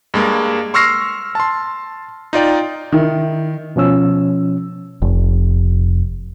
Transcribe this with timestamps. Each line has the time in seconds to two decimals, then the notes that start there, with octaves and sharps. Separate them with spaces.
0.14 G2 G#3 A#3
0.74 C6 C#6 E6 F6 A#6 C7
1.35 A5 C6
2.33 D#4 F4 D5 G5
2.92 D#3 E4
3.76 B2 F3 C#4 E6
5.02 F1